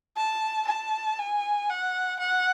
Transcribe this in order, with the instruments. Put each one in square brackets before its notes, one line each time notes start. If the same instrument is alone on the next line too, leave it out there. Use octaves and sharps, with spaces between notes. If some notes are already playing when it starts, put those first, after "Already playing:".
[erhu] A5
A5
G#5
F#5
F#5